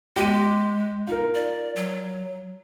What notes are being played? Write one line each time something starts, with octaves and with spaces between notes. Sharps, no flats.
G#3 G4 D6 D#7
D#4 F4 A#4
D5
F#3